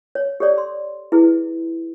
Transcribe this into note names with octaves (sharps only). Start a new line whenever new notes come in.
C#5
G4 A4 C#5 D5
C6
E4 G#4 B4